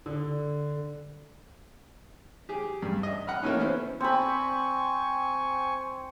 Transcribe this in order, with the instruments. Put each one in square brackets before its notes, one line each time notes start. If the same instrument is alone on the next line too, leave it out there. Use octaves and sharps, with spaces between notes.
[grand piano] D3
[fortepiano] G4 G#4
G2
D#5 E5
F#5 B5 F6
E3 A3 A#3 C#4 D#4
B3 C#4 E4 C5
[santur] C4 B5 [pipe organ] G#5 C#6